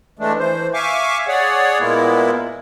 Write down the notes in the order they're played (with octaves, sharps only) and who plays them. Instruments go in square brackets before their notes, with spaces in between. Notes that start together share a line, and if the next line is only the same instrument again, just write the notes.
[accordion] E3 G#3 A3 D4
E3 C5
E5 F5 G#5 C#6 D6
G#4 C#5 D5 F#5
A#2 G#3 A#3 B3 E4